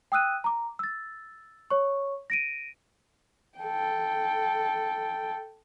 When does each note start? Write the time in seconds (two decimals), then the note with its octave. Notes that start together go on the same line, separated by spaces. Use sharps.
0.12 G5 D#6 E6 F#6 D#7
0.44 A#5 D6
0.79 E6 A6
1.70 C#5 C#6
2.30 A#6 D7 D#7
3.59 A4 G5